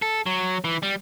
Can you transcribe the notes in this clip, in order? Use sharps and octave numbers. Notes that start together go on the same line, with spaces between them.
A4
F#3
E3
G3